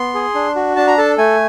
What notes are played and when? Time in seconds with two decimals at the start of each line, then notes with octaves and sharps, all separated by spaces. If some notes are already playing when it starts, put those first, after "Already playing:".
Already playing: B3 C6
0.15 G#4
0.35 D4
0.56 F#4
0.76 D4 A5
0.87 A#5
0.98 A4 A5
1.18 A3 G#5